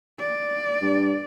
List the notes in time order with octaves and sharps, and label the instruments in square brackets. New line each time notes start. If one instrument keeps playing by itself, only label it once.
[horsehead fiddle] D5
[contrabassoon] G2